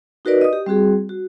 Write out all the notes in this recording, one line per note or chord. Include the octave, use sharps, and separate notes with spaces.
D#4 F#4 A#4 B4 D5 D#5
D#5 D#6
G4
G3 C4 F#4 G#4
F#4